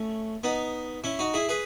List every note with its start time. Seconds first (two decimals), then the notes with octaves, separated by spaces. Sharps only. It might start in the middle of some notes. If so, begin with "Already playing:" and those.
Already playing: A3 C#4
0.44 B3 D#4
1.04 C#4 E4
1.19 D#4 F#4
1.34 E4 G#4
1.49 G#4 B4